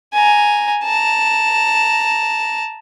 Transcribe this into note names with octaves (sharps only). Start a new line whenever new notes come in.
G#5 A#5
A5 A#5